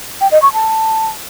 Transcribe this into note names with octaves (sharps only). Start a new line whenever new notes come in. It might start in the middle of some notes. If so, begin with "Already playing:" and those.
G5
D#5
C#6
A5